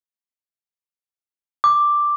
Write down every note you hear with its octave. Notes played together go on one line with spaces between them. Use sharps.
D6